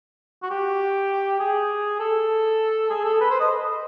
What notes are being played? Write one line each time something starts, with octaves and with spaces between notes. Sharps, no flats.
F#4
G4
G#4
A4
G#4
A4
B4
C5
D#5